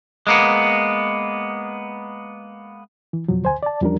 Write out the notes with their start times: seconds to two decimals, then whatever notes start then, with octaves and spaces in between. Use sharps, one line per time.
0.27 G#3 A#3 B3
3.13 E3
3.28 F2 B2 F3 F#3
3.43 D2 C5 G#5
3.63 D5 A5
3.81 E2 F3 G3 C#4 D4 A#4